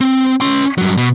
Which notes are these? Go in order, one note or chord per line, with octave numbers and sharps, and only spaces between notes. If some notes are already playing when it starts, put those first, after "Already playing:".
C4
C#4 C6
G2 F#3
B2